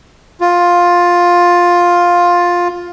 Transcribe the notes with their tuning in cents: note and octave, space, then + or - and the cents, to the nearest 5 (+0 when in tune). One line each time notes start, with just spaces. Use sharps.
F4 +10